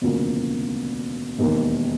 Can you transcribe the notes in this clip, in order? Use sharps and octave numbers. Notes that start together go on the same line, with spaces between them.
E1 D2 C#3 F3 A#3
E1 D#2 D#3